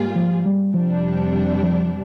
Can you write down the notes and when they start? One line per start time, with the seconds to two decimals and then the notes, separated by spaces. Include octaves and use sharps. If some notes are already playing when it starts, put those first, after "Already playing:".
Already playing: G#2 G3 A#3 F4 G#4
0.16 F3
0.46 G3
0.74 F2 C3 F3 G3 D4
1.63 F3